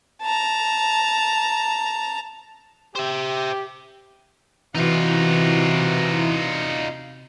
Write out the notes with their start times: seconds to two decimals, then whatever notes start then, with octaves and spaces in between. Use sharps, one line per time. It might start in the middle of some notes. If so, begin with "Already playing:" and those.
0.22 A5 A#5
2.95 G4 C5 E5
4.75 C3 E3 D#4 F4 F#4